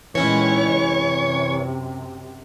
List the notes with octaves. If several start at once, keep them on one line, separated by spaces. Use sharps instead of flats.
A#2 D#3 E3 G#3 C#4 E4 C#5
F#2 C3